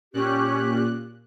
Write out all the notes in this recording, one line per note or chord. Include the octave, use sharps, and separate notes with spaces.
A#2 C#4 G4 F#6